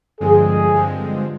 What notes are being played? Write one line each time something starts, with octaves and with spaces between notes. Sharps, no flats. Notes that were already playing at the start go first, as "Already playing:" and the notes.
G2 D3 F3 G#3 C4 G#4
G2 D3 F3 G#3 C4